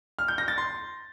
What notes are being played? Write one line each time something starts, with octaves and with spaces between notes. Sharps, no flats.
F6
G6
A#6
A6
C6